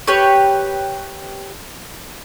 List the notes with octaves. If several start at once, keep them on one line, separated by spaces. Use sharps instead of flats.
G4 B4 C#5